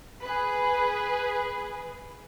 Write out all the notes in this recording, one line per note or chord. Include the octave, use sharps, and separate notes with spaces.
G#4 B4